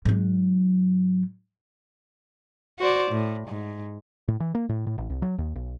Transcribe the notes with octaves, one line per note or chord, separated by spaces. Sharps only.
G#2 F#3
F#4 C5 D5
A2
G#2
A2
E3
A#3
A2
A2
A1
C2
F#3
D#2
B1